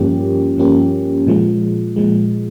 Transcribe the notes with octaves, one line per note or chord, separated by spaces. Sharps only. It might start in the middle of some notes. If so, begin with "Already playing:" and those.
Already playing: G2 F3 A#3 C#4 G4
G2 F3 A#3 C#4 G4
A#2 F3 G#3
A#2 F3 G#3